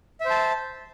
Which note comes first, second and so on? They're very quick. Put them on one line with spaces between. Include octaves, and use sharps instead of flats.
E5 C5 A5